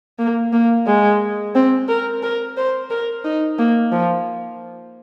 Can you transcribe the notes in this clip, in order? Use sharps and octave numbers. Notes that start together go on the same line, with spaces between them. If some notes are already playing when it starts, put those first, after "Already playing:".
A#3
A#3
G#3
C4
A#4
A#4
C5
A#4
D#4
A#3
F3